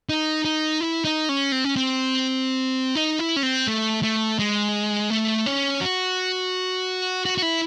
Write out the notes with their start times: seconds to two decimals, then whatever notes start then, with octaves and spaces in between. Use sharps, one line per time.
0.09 D#4
0.45 D#4
0.81 E4
1.05 D#4
1.29 C#4
1.52 C4
1.64 C#4
1.76 C4
2.95 D#4
3.19 E4
3.36 C#4
3.43 C4
3.68 A3
4.03 A3
4.39 G#3
5.10 A3
5.46 C#4
5.81 F#4
7.25 F#4
7.38 F#4
7.42 E4